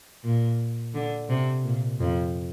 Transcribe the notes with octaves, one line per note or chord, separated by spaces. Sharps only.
A#2
D3
C3
A#2
F2